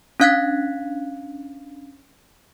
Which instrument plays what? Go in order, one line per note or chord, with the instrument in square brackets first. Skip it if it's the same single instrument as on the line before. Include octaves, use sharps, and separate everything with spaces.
[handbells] C#4 D4 F5 F#6 G#6 B6